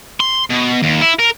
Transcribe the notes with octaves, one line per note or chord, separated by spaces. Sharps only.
C6
B2
D#2
E4
A#4